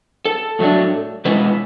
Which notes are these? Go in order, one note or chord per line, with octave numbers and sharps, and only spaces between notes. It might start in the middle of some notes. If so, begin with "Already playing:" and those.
A4
A2 F#3 A3 D4
B2 G#3 C#4 E4 B4